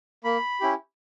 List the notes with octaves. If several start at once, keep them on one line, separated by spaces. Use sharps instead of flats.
A#3 B5
C#4 E4 G4